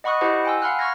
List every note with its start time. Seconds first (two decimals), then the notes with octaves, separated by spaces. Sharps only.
0.04 D#5 F#5 B5 C#6 D#6 F#6
0.21 E4 G4 C5 D#5 F#5 A5
0.45 G5 G#5 C6 E6
0.62 F5 F#5 B5 C6 F6 F#6
0.79 C#6 F6 G#6 A#6